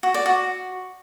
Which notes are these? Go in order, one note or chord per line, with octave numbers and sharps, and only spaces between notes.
F#4
D5
F#4